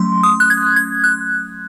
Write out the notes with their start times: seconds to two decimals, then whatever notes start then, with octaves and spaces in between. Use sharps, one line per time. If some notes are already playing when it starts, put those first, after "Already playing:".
Already playing: F#3 A3 C#4 C6
0.23 D#6
0.40 F#6
0.50 G#6
0.76 G#6
1.04 F#6